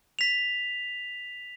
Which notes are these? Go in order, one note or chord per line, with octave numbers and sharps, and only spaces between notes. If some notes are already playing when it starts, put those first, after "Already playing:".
B6 F7